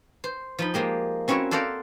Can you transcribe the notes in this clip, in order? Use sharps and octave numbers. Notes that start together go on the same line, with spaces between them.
C5
F3 D#4 B5
F3 G#3 A#3 G4
C4 C#4 E4 F#4 A#4 C#5
A4 C5 D5 F5 F#5 A#5